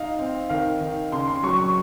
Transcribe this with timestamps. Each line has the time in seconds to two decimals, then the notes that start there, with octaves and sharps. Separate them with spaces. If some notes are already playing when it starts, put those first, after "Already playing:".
Already playing: D#4 F5
0.19 C4
0.49 D#3 F5
0.81 D#3
1.12 C#3 C6
1.27 C6
1.43 F#3 C#6
1.59 C#6